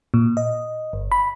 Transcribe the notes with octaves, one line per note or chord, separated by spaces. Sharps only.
A#2
D#5
G1
B5